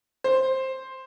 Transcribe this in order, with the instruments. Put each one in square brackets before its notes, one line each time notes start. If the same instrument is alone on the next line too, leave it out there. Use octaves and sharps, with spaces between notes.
[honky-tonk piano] C5